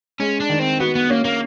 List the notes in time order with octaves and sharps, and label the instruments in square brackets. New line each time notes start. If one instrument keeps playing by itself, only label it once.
[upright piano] G#3 [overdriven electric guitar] C#4
[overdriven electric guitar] D4
[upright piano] D#3
[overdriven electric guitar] C4
[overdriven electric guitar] B3 [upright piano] F#4
[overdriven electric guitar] B3
[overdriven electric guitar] A#3 [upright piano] C#4
[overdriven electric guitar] A#3